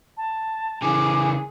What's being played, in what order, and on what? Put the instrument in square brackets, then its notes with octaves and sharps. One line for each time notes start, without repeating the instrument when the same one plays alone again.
[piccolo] A5
[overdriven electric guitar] C#3 E3 [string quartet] G#4 [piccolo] D6